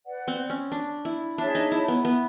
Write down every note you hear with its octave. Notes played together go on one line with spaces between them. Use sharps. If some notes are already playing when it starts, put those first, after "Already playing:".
B4 D5 F#5
C4
C#4
D4
E4
D4 G#4 C#5 E5 A5
D#4
E4
B3
B3